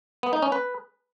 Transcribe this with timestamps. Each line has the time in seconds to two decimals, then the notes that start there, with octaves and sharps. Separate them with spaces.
0.23 B3
0.33 D#4
0.42 C#4
0.52 B4